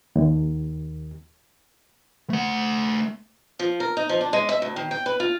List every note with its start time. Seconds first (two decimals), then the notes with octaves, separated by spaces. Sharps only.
0.16 D#2
2.30 A3 F#5
3.59 F3
3.80 A#4
3.97 D#4
4.09 F3
4.21 D4
4.33 G#3
4.49 E5
4.62 D2
4.76 D#3
4.91 G5
5.06 B4
5.20 F4